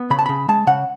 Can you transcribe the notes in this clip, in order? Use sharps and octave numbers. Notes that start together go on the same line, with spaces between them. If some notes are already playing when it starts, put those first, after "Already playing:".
Already playing: B3
C#3 B5
A5
C#3 B5
G#3 A5
C#3 F#5